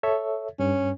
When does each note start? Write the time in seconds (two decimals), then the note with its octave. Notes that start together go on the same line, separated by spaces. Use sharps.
0.03 A4 C#5 E5
0.59 G2 C#4